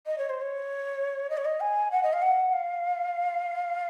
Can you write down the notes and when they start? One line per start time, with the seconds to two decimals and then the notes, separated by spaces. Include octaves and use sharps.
0.07 D#5
0.18 C#5
0.29 C5
0.41 C#5
1.30 D#5
1.37 C#5
1.45 D#5
1.60 G#5
1.91 F#5
2.03 D#5
2.13 F5
2.22 F#5
2.53 F5